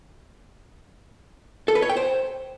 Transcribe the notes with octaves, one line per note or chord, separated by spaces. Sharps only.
A4
B4
C#5
G5
C5